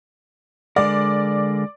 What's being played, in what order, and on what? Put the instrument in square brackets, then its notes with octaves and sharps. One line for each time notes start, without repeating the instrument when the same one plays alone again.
[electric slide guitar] D3 G#3 A#4 [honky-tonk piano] D5